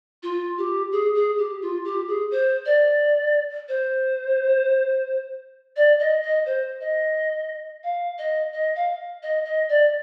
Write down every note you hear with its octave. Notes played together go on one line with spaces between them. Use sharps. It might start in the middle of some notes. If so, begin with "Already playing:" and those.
F4
G4
G#4
G#4
G4
F4
G4
G#4
C5
D5
C5
D5
D#5
D#5
C5
D#5
F5
D#5
D#5
F5
D#5
D#5
D5